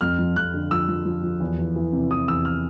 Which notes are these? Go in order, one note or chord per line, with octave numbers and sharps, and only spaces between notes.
F2 F6
F3
F2 F#6
D3
F3 E6
F3
F3
F3
E2
E3
E3
C3
E3 D#6
E2 E6
F6